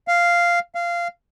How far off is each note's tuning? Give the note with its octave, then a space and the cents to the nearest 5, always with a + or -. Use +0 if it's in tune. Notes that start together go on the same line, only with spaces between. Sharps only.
F5 -5
F5 -15